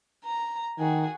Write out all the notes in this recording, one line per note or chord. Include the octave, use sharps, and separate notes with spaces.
A#5
D#3 F#4 G#4